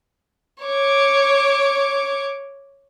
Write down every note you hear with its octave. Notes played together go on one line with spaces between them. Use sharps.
C#5 D6